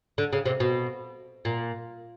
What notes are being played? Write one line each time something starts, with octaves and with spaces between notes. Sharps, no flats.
D3
C#3
C3
B2
A#2